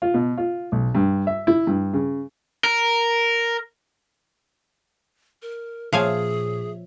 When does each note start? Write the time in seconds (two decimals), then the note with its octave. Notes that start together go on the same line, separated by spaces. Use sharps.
0.02 F4
0.14 B2
0.38 F4
0.72 B1
0.95 G2
1.27 E5
1.47 E4
1.67 G2
1.93 C#3
2.64 A#4
5.42 A#4
5.93 A#2 F3 G#4 C#5 E5 F5 G#5